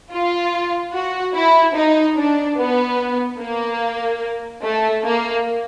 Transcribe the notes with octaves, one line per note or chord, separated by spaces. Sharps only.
F4
F#4
E4
D#4
D4
B3
A#3
A3
A#3